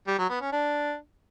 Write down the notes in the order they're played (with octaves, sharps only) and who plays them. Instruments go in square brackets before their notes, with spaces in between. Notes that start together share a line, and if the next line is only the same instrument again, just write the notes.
[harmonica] G3
F#3
B3
C#4
D4